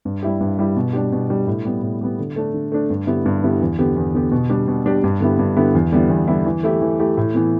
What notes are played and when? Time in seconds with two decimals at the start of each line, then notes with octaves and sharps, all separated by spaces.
0.05 G2
0.23 G3 E4 G4
0.41 G2
0.59 G3 E4 G4
0.76 B2
0.93 G3 D4 G4
1.12 B2
1.30 G3 D4 G4
1.47 A2
1.65 G3 B3
1.83 A2
2.01 G3 B3
2.19 D3
2.36 A3 D4
2.54 D3
2.72 A3 D4
2.90 G2
3.07 D3 B3 E4 G4
3.26 G2
3.43 D3 B3 E4 G4
3.61 E2
3.79 D3 B3 G4
3.96 E2
4.15 D3 B3 G4
4.31 B2
4.49 G3 D4 G4
4.68 B2
4.86 G3 D4 G4
5.04 G2
5.21 D3 B3 E4 G4
5.39 G2
5.56 D3 B3 E4 G4
5.75 E2
5.92 D3 G3 B3 E4
6.09 E2
6.28 D3 G3 B3 E4
6.46 E3
6.63 A3 E4 G4
6.82 E3
6.99 A3 E4 G4
7.17 A2
7.34 E3 B3